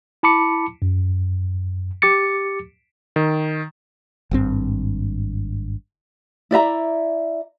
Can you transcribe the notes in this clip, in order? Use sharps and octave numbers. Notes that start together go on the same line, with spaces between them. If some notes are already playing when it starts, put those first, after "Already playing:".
E4 A5 B5 D6 C#7
F#2
G4 D6 A6 C#7
D#3
G#1 G2 C4
E4 D5 E5 A#5